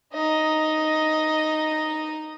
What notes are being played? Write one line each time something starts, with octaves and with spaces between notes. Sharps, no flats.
D#4 D#5